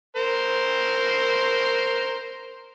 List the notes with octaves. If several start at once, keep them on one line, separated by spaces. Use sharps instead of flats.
A#4 C5